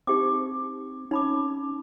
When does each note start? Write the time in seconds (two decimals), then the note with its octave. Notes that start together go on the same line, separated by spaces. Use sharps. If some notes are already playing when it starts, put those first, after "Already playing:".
0.07 C4 D#4 G4 D6
1.11 C#4 D#4 B5 D6